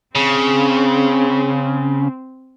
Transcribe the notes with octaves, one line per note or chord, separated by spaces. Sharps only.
C#3 C4